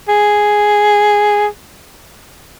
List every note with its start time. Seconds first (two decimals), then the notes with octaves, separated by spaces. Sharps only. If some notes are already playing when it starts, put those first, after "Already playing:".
0.09 G#4